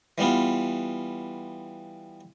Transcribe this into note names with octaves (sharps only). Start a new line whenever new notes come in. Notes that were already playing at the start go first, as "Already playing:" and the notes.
E3 G3 B3 F4